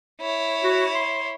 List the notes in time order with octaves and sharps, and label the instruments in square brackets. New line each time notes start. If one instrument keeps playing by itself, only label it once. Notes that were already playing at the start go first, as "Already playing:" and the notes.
[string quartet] E4 C#5
[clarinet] F#4
C6